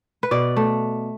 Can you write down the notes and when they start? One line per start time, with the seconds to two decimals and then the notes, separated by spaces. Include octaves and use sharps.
0.23 B4
0.31 B2 D5
0.57 A3